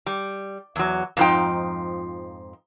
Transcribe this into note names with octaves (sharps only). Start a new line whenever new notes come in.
G3
E2 F#3
F2 G#2 F3 D#4 G5